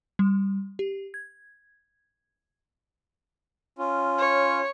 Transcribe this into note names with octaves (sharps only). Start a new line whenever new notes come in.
G3
G4
G#6
C#4 F4
C#5